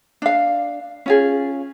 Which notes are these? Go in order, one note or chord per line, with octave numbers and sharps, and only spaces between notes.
D4 F5
C#4 F4 G#4